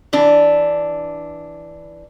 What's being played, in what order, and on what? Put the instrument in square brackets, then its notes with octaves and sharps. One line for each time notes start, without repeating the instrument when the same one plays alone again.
[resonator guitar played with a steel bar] E3 D4